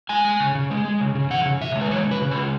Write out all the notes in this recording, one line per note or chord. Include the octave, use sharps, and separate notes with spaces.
G#3 G#5
G#3
C#3
C#3
G#3
G#3
C#3
C#3
E3 F#5
C#3
C#3 E5
G#3
B4
E3 C#5
C#3 B4
C#3
B4
G#3